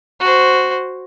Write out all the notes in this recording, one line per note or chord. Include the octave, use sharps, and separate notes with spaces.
F#4 C5